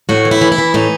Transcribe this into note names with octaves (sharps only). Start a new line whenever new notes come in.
A2 F#4
E3
E4
E3
E4
E3
A2 D#4